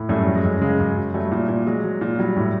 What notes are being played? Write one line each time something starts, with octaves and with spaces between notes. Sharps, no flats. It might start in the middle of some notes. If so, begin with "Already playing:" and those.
Already playing: A2
F#2 G3 A3
F#3
G#3
F#2
C#3 G#3
F#2
F#3
F#3 G3 A3
A#2
A#2
F#3 G#3
F#3
A#2
F#3 G3
A2